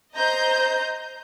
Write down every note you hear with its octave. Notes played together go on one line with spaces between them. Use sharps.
C5 D#5 A#5 G6